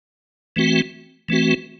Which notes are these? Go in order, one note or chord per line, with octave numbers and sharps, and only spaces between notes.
E3 A3 C4 F#4
E3 A3 C4 F#4